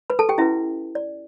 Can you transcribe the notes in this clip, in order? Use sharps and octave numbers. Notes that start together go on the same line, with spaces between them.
B4 B5
A4 A5
G4 G5
C#4 E4 F#4 B4 E5
D5